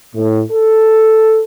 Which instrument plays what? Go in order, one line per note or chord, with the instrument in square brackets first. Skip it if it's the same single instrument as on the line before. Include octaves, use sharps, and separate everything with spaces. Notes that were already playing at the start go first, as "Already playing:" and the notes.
[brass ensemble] A2
A4